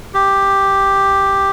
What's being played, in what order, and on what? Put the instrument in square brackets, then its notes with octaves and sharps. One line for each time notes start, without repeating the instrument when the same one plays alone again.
[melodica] G4